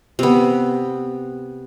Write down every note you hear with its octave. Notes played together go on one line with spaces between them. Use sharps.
C3 B3